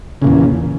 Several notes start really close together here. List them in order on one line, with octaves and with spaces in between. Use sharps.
C#3 A#2 E2